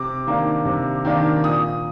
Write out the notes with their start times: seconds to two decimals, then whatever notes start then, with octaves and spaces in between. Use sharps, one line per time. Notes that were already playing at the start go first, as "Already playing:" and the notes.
Already playing: C3 D6
0.26 D#3 A#3 D4
0.65 C3
1.05 D#3 A#3 D4
1.44 A#2 D#6